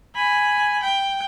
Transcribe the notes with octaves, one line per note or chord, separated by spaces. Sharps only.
G#5 B5
G5